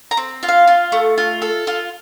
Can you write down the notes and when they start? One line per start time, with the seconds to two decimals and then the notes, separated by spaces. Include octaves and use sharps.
0.11 A#5
0.17 C4
0.43 F4
0.49 F5
0.68 F4
0.92 A3
1.18 F4
1.42 A4
1.67 F4